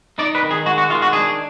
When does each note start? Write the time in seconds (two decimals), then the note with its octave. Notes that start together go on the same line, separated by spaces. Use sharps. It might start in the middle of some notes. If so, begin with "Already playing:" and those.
0.18 D#4 D5
0.35 B4
0.43 D#3
0.51 G#4
0.66 G#3 F#4
0.78 F#4
0.90 D#3 F4
1.02 F#4
1.13 D4 G#4